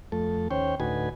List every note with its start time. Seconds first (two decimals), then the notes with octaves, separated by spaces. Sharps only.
0.12 F2 A3 A4
0.51 D#2 C#4 C5 C#5 G5
0.80 D2 A2 D#4 F#4 B4 G#5